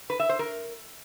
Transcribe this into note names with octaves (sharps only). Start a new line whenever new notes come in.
B4
E5
C5
A#4